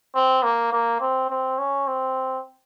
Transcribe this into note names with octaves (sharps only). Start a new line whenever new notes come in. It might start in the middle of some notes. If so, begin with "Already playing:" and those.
C4
A#3
A#3
C4
C4
C#4
C4